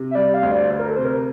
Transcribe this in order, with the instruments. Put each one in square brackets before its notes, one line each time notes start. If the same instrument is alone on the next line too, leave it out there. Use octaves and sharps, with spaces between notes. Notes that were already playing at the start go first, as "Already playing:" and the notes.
Already playing: [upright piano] C3
[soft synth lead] E5
[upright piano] G3 [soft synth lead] D5
[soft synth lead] F5
[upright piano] D2
[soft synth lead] D5
[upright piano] D2 [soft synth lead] C5
[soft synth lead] A#4
A4
[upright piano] C3 [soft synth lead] C5
[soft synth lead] A#4